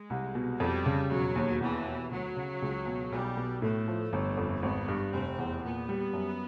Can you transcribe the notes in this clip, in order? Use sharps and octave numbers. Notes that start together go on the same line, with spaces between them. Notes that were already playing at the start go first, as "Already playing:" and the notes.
Already playing: G#3
C2
B2
F2 G3
C#3
E1 F#3
D#2
E2 E3
B2
D2 F#3
C#3
C#2
B2
B1 G3
B2
A2 A3
F3
G1
F2
G#1 B3
G2
F1 C4
E2
A#2 B3
G3
F#2